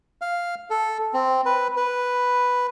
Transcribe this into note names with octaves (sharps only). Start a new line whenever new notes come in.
F5
A4
C4
B4
B4